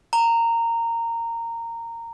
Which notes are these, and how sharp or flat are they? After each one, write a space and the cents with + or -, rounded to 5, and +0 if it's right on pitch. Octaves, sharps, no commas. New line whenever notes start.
A#5 -15